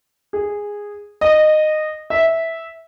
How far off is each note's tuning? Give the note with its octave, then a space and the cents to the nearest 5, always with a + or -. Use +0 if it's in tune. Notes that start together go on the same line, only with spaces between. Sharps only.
G#4 -10
D#5 -15
E5 -10